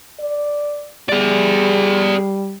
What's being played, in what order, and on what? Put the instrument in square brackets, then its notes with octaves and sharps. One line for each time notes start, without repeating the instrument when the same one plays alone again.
[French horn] D5
[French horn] G3 [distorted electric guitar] G#4 D5